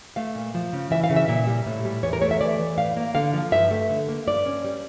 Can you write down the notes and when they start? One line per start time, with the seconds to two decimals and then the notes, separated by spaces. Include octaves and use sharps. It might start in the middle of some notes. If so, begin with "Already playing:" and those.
0.16 A3 F5
0.35 A#2
0.54 F3
0.73 C#3
0.91 E3 E5
1.04 F5
1.10 C#3
1.16 E5
1.28 A#2 E5
1.47 G3
1.66 A2
1.85 G3
2.03 E2 C#5
2.13 A#4
2.22 A3 C#5
2.31 E5
2.41 E3 D5
2.59 E3
2.78 A2 F5
2.97 A#3
3.15 D3 F5
3.33 F3
3.52 G2 E5
3.71 A3
3.90 D3
4.09 A#3
4.27 G2 D5
4.46 C#4
4.65 G3